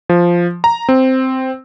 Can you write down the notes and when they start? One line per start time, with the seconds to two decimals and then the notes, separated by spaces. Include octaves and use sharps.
0.09 F3
0.64 A#5
0.89 C4